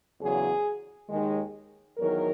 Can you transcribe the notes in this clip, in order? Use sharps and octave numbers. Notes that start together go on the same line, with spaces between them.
E2 C#3 F#3 G#4
D#2 D#3 G#3
E2 D#3 F#3 A#4